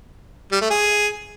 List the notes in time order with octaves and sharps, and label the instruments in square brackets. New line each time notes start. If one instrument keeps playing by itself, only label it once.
[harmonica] G3
A3
G#4